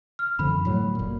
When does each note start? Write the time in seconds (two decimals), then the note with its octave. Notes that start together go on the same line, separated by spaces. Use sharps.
0.19 F6
0.39 F#2 D3 F3 B5
0.65 A2 F#3
0.95 F#1 A#2